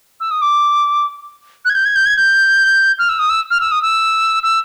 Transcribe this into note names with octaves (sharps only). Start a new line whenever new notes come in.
E6
D#6
D6
F#6
G#6
G6
G#6
G6
G#6
G6
F6
E6
D#6
E6
F6
E6
D#6
E6
E6